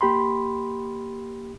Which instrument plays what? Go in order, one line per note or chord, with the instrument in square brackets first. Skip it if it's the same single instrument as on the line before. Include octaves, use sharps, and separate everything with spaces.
[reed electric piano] A#3 G4 B5 C6